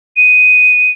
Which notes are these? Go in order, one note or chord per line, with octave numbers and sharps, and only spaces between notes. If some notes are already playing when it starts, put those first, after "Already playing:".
D#7